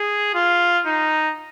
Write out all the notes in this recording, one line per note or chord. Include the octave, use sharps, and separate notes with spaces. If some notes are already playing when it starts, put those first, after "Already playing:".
Already playing: G#4
F4
D#4